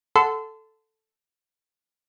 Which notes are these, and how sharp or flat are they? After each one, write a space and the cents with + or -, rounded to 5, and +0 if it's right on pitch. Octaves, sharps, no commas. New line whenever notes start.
A4 +0 F#5 +0 C6 -30